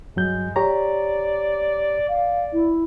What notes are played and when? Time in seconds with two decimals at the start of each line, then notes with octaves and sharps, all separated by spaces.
0.16 G2 F#3 G#3 G6
0.56 G4 C#5 D5 A#5
2.09 D5 F5
2.53 E4